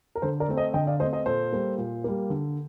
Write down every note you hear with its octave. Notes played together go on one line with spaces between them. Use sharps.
A#4
D3 A4 C5
A#4 D5
A3 C4
C5 D#5
D3 D#5 G5
D5 F5
A3 C4 C5 D#5
C5 D#5
A#2 A4 C5
G3 A#3
A#2
G3 A#3
D3